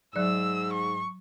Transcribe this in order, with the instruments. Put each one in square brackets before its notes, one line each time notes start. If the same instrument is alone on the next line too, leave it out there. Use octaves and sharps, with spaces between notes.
[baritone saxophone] G#2 [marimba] F#3 D5 [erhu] E6
[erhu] C#6